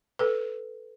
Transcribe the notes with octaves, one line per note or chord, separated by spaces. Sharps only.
A4 B4